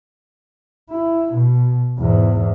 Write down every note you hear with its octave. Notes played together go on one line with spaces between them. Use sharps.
E4
B2
E2 G#2